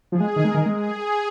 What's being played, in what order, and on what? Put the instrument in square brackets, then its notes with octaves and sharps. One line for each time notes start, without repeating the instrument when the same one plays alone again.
[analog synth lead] F3 [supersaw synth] G#4
[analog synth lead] G#3
D#3
[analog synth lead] G#3 [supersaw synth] A#4
[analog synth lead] D#3
G#3
[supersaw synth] G#4